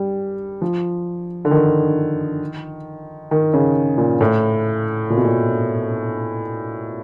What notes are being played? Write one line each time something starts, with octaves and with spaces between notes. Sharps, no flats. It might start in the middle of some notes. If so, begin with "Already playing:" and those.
Already playing: G3
F3
D3
D#3
D#3
C#3
A#2
A2
A#2
B2
A#2